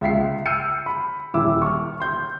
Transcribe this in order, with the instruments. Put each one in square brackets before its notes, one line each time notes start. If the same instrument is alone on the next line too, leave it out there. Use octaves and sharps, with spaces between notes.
[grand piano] C#2 E5 B6 C7
E6 F6 G6 C7 C#7 D#7
B5
D#1 E4 D6 E6
C#6 F6
C6 G6